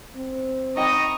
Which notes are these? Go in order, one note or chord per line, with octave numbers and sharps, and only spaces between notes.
C4
D#4 D#5 G5 A#5 B5 C#6